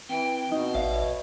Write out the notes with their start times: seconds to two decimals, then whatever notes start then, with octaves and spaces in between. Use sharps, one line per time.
0.09 E3 C4 G5
0.51 B2 D#4
0.75 A1 D5 E5 F5
0.92 C#5